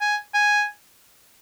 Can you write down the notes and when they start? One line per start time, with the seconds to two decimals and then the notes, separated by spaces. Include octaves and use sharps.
0.01 G#5
0.34 G#5